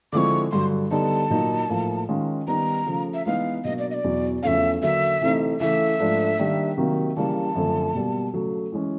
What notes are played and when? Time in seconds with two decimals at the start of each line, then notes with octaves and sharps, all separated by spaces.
0.13 D3 F3 G#3 C4 E4 C#6 D6
0.51 G2 D3 F#3 C6
0.91 D3 G3 B3 D#4 A5
1.30 A#2 F#3 A#3 D#4
1.69 A2 F3 A#3
2.09 D#3 G#3 C#4 F4
2.47 D#3 G3 B3 D#4 A#5
2.87 C#3 F3 A3
3.14 E5
3.26 E3 G#3 B3 D#4 F5
3.64 B2 F#3 A#3 D4 D#5
3.78 D5
3.90 D#5
3.94 D5
4.04 E2 B2 F#3
4.43 E2 C#3 F3 A3 C#4 E5 F5
4.82 D3 F#3 A#3 E5
5.21 C3 E3 A3 C4 D#4
5.60 C#3 E3 A3 E5
5.99 G#2 F3 A3 D4
6.39 D#3 G3 A#3 D4
6.77 C3 D#3 F#3 A#3
7.17 C#3 E3 G3 A#3 A5
7.55 F#2 D3 F3 A3 C4
7.94 B2 G3 A#3
8.34 C#3 F#3 A3
8.72 E3 G#3 C#4